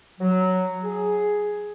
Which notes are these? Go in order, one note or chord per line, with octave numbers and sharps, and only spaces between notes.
F#3
G#4